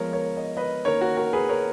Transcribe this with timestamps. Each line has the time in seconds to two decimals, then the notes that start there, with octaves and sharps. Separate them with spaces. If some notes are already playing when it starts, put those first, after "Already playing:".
Already playing: F3 G#3 B3 A#4 C#5
0.13 A#4 C#5
0.37 D#5
0.57 B4 D#5
0.85 D#3 A#3 C#4 A#4 C#5
1.01 F#4 A#4
1.17 F#4 A#4
1.33 G#4 B4
1.49 A#4 C#5